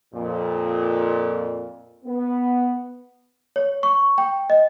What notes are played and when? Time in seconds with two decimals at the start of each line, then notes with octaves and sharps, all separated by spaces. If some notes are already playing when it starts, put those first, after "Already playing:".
0.13 F2 A#2
2.05 B3
3.56 C#5
3.83 C#6
4.18 G5
4.50 D#5